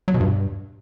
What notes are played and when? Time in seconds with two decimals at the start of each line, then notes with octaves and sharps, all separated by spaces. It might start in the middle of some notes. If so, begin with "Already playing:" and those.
0.08 F#3
0.14 B2
0.20 G2